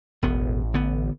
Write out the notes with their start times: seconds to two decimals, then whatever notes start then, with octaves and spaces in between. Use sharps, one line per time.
0.22 E1 A1 B3
0.74 D3 B3